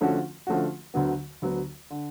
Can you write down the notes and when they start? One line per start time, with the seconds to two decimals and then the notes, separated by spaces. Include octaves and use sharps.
0.01 D3 F3 A3 C#4 F#4
0.47 D3 F3 A3 C#4 F#4
0.94 D2 D3 F#3 B3
1.42 D2 D3 F#3 B3
1.90 D3